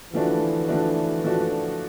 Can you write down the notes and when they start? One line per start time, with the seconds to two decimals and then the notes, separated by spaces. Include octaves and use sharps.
0.13 D3 E3 F3 A3 D4 F#4
0.68 D3 F3 A3 D4 F#4
1.23 D3 F3 A3 D4 F#4